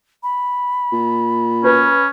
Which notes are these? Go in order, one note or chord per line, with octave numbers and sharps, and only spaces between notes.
B5
A#2
C#4 B4